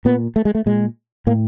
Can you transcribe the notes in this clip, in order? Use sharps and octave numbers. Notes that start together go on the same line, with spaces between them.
A#2 B3
A3
G#3
A3
A#2 G#3
A2 A#3